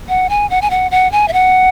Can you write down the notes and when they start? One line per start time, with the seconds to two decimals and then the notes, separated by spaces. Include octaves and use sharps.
0.09 F#5
0.30 G#5
0.50 F#5
0.62 G#5
0.70 F#5
0.91 F#5
1.12 G#5
1.28 E5
1.33 F#5